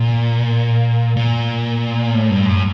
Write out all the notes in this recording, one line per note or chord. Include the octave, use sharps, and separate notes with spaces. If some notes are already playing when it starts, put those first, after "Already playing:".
Already playing: A#2
A#2
A2
G2
F#2